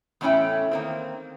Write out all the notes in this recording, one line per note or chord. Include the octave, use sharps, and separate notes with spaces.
E2 A2 A3 C#4 E4 G5
D#3 A#3 C4